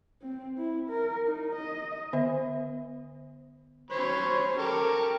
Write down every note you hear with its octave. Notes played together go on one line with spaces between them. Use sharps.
C4
E4
A#4
D#4
D#5
D3 B3 C5 E5
F#3 C#4 C5 C#5 B5
G4 A4 A#4 C#6